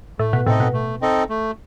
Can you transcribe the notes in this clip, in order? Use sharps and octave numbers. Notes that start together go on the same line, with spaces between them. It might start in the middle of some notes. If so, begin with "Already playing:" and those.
A2 A3
B2
A2 C3 C4 D#4 A4 D#5
B2
A3
C4 D#4 A4 D#5
A3